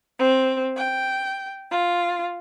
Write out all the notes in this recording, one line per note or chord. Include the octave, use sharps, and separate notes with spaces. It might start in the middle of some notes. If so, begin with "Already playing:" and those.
C4
G5
F4